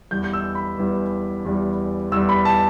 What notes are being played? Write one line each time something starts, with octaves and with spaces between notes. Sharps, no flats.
E2 E3 G3 G6
G6
E6
B5
E2 E3 G3
E2 E3 G3
E2 E3 G3 E6
B5
A5